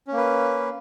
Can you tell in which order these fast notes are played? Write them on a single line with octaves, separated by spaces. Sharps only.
C#4 A#3 B4